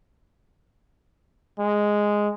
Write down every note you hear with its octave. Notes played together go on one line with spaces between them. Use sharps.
G#3